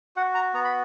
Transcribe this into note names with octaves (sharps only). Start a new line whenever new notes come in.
F#4 F#5
A#5
B3 A#5
B5